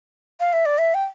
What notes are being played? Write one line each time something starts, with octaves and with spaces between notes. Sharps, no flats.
F5
E5
D5
E5
G5